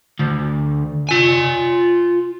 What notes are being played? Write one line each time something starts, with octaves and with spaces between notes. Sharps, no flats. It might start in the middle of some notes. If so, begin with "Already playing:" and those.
D2
F4 G#5